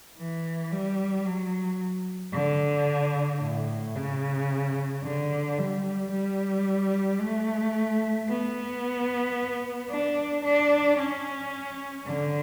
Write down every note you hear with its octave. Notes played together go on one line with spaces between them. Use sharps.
E3
G3
F#3
D3
A2
C#3
D3
G3
G3
A3
B3
D4
D4
C#4
D3